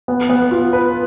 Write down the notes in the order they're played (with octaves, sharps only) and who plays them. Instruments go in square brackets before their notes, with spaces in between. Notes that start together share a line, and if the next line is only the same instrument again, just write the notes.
[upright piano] B3
B3
F4
B4